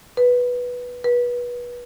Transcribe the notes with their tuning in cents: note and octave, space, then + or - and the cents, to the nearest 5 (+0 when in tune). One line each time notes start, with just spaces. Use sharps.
B4 -5
B4 -25